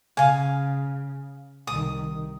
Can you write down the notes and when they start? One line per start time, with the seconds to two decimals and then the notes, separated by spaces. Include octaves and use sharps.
0.17 C#3 F5 G#5
1.67 C2 D#3 D#6